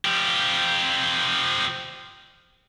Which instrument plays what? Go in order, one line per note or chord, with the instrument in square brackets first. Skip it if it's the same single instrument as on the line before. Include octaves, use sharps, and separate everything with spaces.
[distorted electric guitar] F3 G4